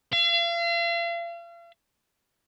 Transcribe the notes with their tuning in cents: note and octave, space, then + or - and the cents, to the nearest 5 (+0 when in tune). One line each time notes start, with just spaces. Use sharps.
F5 -40